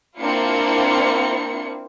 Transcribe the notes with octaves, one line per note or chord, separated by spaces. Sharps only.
A#3 C4 D4 E4 F4 C#7